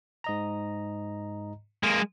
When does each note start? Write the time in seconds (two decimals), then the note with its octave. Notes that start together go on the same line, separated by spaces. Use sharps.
0.24 G#2 D#5 A#5
1.83 G#3 A#3